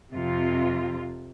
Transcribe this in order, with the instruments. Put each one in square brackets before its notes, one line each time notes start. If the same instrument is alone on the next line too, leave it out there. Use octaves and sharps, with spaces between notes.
[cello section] F2 C3 F4